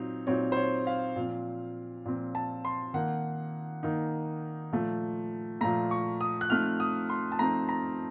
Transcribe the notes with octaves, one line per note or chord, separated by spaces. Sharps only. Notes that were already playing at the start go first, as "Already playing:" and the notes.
Already playing: A#2 F#3 C4 D#4
A#2 F#3 C4 D#4 C#5
C5
C#5
F5
A#2 F3 C4
A#2 F3 C4
A5
C6
D#3 A#3 D#4 F#5
D#3 A#3 D#4
A#2 F3 A3
A#2 F3 A3 A#5
C#6
D#6
F#6
F3 A3 C4 D#4 F6
D#6
C6
A5
F3 A3 C4 D#4 A#5
A#5